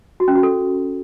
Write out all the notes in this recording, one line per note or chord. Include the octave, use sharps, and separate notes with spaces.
F#4
C#4
F#4
A4